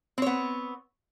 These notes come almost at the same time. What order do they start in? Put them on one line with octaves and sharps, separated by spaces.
C4 C#5 B3